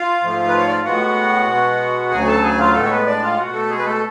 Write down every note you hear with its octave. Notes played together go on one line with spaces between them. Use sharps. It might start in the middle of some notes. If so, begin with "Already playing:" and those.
Already playing: F4 F5
G#2 F3 A3
B4
C#5
D5
F5
A2 G#3 B3 F#4 F#5
B2 G#3 B3
D2 C#3 F#3 G#4 G#5
A4 A5
G#4 G#5
F4 F5
A2 G#3 A3 B3 A4
C#5
B3 B4
D4 D5
F4 F5
B2 A3 F#4 F#5
A3 A4
G#3 G#4
B4
A3 A4